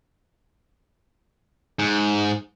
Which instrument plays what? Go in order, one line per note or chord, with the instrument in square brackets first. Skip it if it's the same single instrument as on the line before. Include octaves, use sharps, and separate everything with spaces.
[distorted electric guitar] G#2